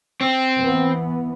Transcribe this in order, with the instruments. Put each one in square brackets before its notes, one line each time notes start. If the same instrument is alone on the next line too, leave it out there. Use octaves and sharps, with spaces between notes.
[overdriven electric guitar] C4
[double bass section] E3 B3